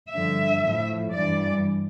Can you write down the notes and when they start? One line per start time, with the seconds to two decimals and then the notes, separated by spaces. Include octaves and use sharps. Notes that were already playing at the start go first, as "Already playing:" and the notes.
0.12 G2 D3 F3 E5
0.63 A2 F3
1.13 G2 E3 G3 D5